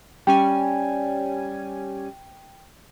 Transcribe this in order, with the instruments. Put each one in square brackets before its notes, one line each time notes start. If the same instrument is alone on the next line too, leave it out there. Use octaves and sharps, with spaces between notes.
[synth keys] G3 C#4 G#5 [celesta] G5